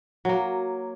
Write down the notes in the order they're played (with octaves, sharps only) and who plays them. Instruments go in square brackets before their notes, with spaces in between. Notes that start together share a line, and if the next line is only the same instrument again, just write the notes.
[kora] F#3 A#3